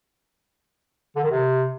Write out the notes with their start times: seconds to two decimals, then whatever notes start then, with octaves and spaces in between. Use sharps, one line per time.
1.16 D3
1.23 D#3
1.31 C3